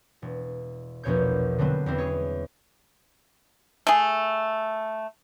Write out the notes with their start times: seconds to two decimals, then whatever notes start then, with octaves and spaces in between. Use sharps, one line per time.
0.22 E1
1.03 A#1 E2 B2 C#5 G6
1.58 D3 F#3 G3 B3 C4
1.86 E2 G3 C4
1.98 G#4 C#5
3.87 A3 G#4